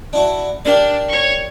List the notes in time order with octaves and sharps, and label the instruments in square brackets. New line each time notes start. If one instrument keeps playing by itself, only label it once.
[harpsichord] D4 E4 F#4
[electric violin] D4 [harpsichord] G4 A#4 D5
[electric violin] C#5 C#6